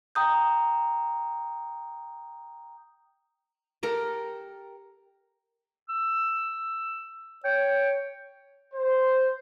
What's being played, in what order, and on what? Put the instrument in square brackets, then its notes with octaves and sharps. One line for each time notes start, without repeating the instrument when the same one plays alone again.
[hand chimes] G5 A#5 D#6 G6
[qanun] G4 A4 A#4
[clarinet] E6
[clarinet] C#5 [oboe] G5
[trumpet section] C5